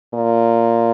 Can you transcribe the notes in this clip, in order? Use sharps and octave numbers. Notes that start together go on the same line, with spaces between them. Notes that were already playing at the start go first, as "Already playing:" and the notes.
A#2